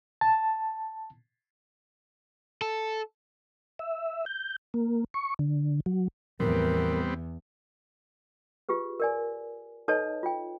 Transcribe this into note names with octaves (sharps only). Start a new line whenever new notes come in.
A5
A4
E5
G6
A#3
C#6
D3
F#3
E2 A2 F3 G3 B3 C4 A#4
F4 G4 G#4 B4
A#4 D5 G#5
D#4 A4 B4 C#5 D#5 A5
F4 G5